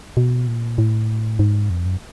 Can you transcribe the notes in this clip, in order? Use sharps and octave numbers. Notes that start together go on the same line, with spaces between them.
B2
A#2
A2
G#2
F2
F#2